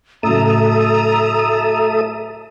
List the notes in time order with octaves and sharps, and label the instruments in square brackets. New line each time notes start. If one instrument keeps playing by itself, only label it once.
[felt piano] A2 C#3 F#3 [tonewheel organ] A4 E5 D#6 [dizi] A#5